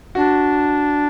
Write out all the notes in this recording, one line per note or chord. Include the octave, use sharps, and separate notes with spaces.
D4 F#4